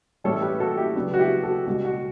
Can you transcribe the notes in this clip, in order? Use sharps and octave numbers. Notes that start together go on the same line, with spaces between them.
A2 E3 G3 C#4 A4 C#5
A4
G4 B4
F#4 A4
E4 G4
C#3 F#3 B3 D4
F#4
E4 G4
F#4 A4
C#2 B2 G3 F#4
F#4